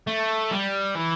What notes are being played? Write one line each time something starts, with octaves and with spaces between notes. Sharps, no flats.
A3
G3
E3